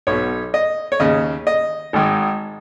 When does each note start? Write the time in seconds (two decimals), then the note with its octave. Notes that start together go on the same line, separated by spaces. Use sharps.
0.07 B1 B2 C#5
0.54 D#5
0.92 C#5
1.00 D#2 C#3 D#5
1.47 D#5
1.93 G#1 G#2 D#3